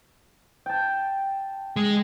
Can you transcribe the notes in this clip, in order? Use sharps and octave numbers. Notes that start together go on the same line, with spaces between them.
G5 A5
G#3